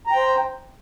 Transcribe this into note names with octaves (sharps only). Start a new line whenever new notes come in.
C5 G5 A#5